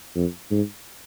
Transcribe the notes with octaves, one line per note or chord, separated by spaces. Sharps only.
F2
G#2